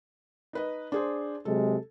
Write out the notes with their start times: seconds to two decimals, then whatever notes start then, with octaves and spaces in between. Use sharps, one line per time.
0.53 D#4 B4 D#5
0.92 D4 G#4 C5
1.45 C3 F#3 G#3 A4